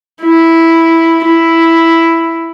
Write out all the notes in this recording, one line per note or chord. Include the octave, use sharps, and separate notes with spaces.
E4
E4